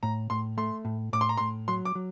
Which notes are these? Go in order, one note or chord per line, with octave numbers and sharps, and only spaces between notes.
A2 A#5
A2 C6
A3 C6
A2
A2 D6
C6
A#5
A2 C6
F#3 C6
D6
F#3